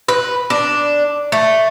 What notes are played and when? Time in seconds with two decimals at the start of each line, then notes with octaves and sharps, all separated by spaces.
0.08 B4
0.50 D4
1.32 A3